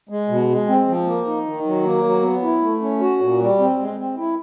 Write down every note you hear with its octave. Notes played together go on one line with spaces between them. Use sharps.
G#3
B2
G#3
C4
F3
A#3
D#4
D#3
F#3
A#3
F#3
B3
E4
A3
C#4
F#4
A#2
G3
C4
G#3
C4
E4